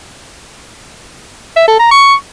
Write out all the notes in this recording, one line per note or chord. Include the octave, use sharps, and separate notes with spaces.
E5
A4
A#5
C#6